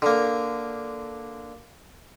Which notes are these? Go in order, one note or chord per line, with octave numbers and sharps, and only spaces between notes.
D3 A#3